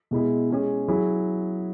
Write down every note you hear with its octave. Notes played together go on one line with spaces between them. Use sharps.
B2 G#3 E4 G#4
G#3 C#4 G#4
F#3 E4 G#4